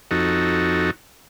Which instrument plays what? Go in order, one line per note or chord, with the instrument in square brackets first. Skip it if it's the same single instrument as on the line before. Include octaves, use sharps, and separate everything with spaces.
[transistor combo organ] F2 D#4 F#4 A4